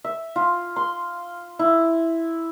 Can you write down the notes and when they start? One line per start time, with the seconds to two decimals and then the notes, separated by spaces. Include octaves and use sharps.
0.04 E5
0.36 F4
0.76 C6
1.59 E4